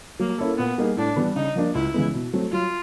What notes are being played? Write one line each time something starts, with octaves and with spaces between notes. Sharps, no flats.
F#3 A#3
A#3 C#4 E4 A4
A#2 B3
G3 A#3 D#4 G#4
A2 D4
E3 G3 B3 D4
C#3 D#4
F3 A#3 D4 F4
C#2 E4
C#3 E3 G#3 B3
B2
F#3 A3 C4
F#3 F4